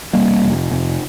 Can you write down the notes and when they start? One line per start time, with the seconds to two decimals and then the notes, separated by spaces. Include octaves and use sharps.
0.13 F1 G3 A#3
0.43 F1
0.71 F1